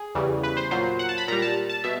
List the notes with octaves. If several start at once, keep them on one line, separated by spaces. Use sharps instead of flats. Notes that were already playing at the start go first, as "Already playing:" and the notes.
Already playing: G#4
E2 C#3 E3 G3
B4
C5
A#2 F#3 C5
F#5
A5
B5
A#2 G3 A#5
A5
A5
B2 E5